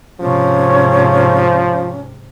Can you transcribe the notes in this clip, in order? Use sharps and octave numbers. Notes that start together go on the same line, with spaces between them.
G#2 C3 F3 C#4